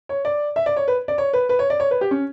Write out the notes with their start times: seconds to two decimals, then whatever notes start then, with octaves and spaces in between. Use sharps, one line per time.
0.09 C#5
0.25 D5
0.56 E5
0.66 D5
0.76 C#5
0.88 B4
1.08 D5
1.18 C#5
1.33 B4
1.49 B4
1.59 C#5
1.70 D5
1.80 C#5
1.91 B4
2.01 G4
2.11 C#4